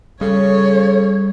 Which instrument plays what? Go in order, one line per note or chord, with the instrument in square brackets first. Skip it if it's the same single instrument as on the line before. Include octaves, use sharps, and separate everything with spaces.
[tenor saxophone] C#3 [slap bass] G3 [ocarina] A4 [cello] C#5